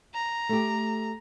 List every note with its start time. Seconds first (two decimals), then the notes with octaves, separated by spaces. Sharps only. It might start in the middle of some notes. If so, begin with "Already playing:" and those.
0.14 A#5
0.49 A3 G4